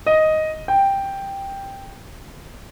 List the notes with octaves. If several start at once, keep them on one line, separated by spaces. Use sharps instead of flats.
D#5
G5